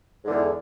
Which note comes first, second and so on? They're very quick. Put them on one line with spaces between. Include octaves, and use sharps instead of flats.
G#2 D3 E2